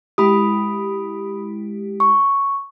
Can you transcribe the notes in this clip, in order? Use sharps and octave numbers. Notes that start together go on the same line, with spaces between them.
G#3 E4 G4 B5 D#6
C#6